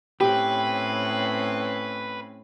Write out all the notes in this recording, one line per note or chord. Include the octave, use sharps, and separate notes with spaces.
A2 C4 C#4 G4 B4